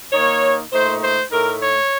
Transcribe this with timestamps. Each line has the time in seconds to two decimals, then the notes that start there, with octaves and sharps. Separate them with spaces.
0.12 D#3 A#3 D#4 C#5
0.72 A#2 A3 D#4 C5
1.01 C5
1.30 A2 A3 D#4 A#4
1.59 C#5